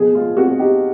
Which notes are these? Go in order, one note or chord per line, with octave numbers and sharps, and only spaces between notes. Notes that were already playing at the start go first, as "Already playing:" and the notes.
Already playing: B2 F3 G#4
G#3 F4
C4 F#4
D#4 G4